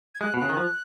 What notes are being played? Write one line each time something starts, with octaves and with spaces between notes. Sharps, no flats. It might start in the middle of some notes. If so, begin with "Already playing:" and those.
G#6
G#3 F#6
B2
C#3 F#6
D#3
F3